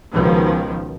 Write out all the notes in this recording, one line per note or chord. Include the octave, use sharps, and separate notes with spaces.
C#2 B2 D#3 F3